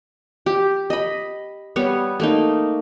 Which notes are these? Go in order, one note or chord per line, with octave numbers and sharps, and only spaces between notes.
G4
D#5 B5
G3 B3 C#5
A3 A#3 D#4